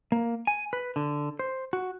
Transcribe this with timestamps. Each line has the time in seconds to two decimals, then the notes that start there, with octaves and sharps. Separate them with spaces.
0.12 A#3
0.47 G#5
0.73 B4
0.96 D3
1.39 C5
1.73 F#4